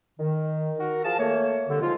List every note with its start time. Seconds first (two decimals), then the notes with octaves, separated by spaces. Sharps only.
0.19 D#3
0.79 F#4 A#4
1.04 F3 G#4 F5 A5
1.18 A3 A#3 C#5
1.69 C2 D3
1.82 F3 G#3 D#4 F4